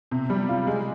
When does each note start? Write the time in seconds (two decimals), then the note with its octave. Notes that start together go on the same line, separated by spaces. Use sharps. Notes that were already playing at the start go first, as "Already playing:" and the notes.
0.11 C3
0.30 G3
0.49 F4
0.67 G#3